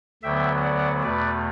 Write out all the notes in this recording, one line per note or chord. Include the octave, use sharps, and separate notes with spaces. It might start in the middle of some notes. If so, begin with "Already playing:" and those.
D2 D3 F#3 B3 E5 G5
D5 F#5
E2 B2 A3 B4 D5